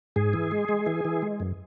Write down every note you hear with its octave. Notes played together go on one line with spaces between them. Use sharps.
G#2 G#4
E3
G#3
G#3
E3
E3
G#3
F#2